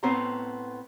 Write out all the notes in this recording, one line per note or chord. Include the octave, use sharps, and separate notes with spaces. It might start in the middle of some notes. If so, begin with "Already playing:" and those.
A2 B3 C4 C5 C#5 A#5